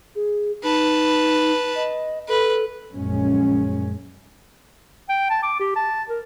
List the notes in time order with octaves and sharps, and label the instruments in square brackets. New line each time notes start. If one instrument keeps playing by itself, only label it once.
[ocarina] G#4
[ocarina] D#4 [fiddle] B4 A5
[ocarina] D#5
[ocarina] A4 [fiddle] B4
[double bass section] A#1 F#2 G#3 C#4
[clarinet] G5
A5
D6
G4
A5
A#4